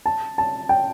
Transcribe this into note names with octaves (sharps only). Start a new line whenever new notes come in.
A5
A5
G5